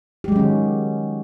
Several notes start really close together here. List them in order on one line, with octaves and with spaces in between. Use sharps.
G4 G#3 F#3 C#4 D#3